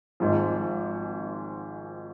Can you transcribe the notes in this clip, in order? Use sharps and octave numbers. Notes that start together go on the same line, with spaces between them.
G#1 G#2 F3